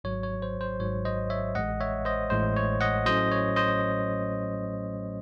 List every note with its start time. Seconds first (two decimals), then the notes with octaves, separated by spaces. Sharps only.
0.04 G#1 G#2 F#3 C#5
0.23 C#5
0.42 C5
0.61 C5
0.80 G#1 G#2 F#3 C#5
1.05 C5 D#5
1.30 C#5 E5
1.55 A1 A2 G#3 D#5 F#5
1.81 C#5 E5
2.05 C5 D#5
2.30 A1 A2 G#3 C5
2.56 C#5
2.81 D#5 F#5
3.06 A2 F#3 A3 C#4 C5 D#5
3.32 C#5
3.56 C5 D#5